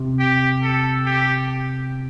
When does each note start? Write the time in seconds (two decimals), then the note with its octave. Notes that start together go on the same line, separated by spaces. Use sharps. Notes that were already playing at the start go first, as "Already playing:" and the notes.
Already playing: C3
0.19 G4
0.62 A4
1.06 G4